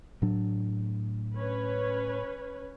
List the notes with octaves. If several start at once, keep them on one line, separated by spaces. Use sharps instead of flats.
A2 F#3 D4
C#4 B4 C#5